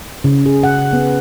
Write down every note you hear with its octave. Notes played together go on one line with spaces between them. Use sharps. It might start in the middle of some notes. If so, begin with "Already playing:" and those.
C#3
G#4
F#5
B3